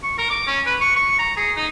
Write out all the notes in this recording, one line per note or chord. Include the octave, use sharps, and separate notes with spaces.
C#6
A#4
D6
C#4
B4
C#6
C#6
A#5
G#4
D#4